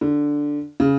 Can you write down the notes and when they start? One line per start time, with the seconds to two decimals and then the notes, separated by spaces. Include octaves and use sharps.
0.01 D3
0.80 C#3